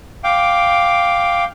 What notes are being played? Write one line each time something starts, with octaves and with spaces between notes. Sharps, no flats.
F5 G5 D6